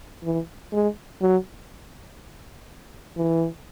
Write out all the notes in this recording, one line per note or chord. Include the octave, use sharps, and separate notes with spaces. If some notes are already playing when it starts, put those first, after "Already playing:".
E3
G#3
F#3
E3